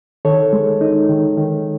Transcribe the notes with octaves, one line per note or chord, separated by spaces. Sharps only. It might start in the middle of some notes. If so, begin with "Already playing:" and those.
D#3 A4 C#5
G#3
D#4
D#3
D#3